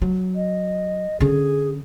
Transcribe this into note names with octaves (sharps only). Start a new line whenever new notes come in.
F#3
D#5
D3 C#4 G#4